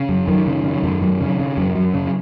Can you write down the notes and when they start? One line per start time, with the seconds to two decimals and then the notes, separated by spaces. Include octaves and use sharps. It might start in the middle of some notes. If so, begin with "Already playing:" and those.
Already playing: C#3
0.09 F#2
0.28 F#2 D#3
0.47 C#3
0.64 C#3
0.83 F#2
1.02 F#2
1.20 C#3
1.39 C#3
1.57 F#2
1.75 F#2
1.94 C#3